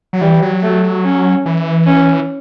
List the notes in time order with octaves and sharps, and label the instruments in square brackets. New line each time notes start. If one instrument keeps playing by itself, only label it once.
[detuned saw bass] F#3
[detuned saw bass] E3 [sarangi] G3
[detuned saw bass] F#3
[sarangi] A3
C#4
[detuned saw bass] E3
[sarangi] C#4